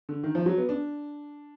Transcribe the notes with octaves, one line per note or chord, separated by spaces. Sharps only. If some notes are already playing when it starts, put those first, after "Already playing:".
D3
D#3
F3
F#3
B3
D4